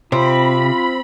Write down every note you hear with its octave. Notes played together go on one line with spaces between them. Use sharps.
C3 C4 F4 B5